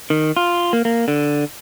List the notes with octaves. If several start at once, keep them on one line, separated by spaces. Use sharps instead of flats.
D#3
F4
A#3
A#3
D3